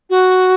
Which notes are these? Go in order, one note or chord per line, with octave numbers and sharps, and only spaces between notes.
F#4